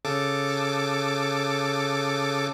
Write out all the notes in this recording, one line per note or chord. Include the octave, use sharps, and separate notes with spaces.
C#3 A4 D6